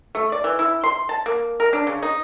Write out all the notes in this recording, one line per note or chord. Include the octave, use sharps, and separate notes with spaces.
A3
D5
E3
E4
C6
A5
A#3
A#4
D4
C#3
D#4